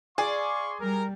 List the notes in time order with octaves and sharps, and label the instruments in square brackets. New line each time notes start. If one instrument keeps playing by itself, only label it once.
[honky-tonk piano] G#4 [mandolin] D5 [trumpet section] F5 C6 C#6
[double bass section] G3 [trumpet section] A#4